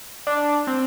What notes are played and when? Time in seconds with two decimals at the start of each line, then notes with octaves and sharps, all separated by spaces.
0.27 D4
0.67 C4